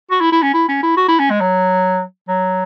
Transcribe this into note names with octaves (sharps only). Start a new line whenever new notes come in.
F#4
E4
E4
C#4
E4
C#4
E4
F#4
E4
C#4
G#3
F#3
F#3